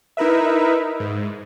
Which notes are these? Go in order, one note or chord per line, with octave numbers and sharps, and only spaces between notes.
D#4 E4 A#4 B4 E5
G#2